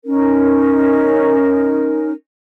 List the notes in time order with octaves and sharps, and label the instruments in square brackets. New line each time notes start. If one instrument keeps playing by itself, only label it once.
[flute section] C#4 D#4 A#4